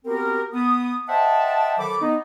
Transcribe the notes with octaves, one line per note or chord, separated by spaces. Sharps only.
B3 C4 F#4 G4 A#4
B3 D#6
C5 D#5 E5 F#5 G5 A5
D#3 F#3 A4 B5 D6
B3 D#4